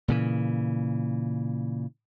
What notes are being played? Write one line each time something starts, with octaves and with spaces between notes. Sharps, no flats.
A#2 C#3 E3